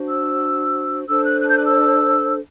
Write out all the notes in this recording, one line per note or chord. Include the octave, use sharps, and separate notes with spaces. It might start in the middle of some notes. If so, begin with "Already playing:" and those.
Already playing: D4 F#4 C5
E6
D4 A4 C5 E6
F#6
F#6
G6
F#6
E6